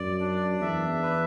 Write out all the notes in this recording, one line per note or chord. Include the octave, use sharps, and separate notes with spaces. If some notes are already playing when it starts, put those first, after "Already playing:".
Already playing: F#2 D5
D4
E2 E5
B4